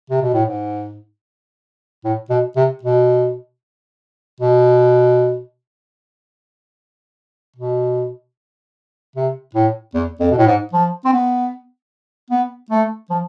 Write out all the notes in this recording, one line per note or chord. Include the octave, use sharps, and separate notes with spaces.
C3
B2
A2
G#2
A2
B2
C3
B2
B2
B2
C3
A2
E2
F2
B2
A2
G#2
F3
C4
B3
B3
A3
F3